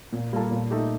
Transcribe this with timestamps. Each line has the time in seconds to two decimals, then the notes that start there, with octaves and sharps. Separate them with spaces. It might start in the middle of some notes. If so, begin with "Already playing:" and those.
0.13 A#2
0.33 G3 A#3 F4 A4
0.51 A#2
0.70 A3 D#4 G4